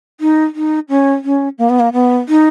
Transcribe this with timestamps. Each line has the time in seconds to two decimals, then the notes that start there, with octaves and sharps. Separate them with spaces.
0.21 D#4
0.55 D#4
0.89 C#4
1.25 C#4
1.58 A#3
1.70 B3
1.80 A#3
1.93 B3
2.29 D#4